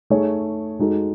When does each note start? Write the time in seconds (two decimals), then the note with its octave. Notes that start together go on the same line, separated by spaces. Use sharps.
0.10 A3 D#4 G#4 C#5
0.79 G#3 D#4 F#4 A4